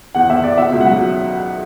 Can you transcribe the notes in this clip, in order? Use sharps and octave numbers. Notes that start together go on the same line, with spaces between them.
E2 F#5
E2 E5
E2 D5
B2 E5
C#2
F#5
F#3